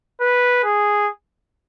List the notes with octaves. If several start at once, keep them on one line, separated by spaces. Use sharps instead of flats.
B4
G#4